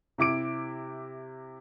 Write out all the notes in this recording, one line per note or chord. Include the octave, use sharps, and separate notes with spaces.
C3 E4 D6 D7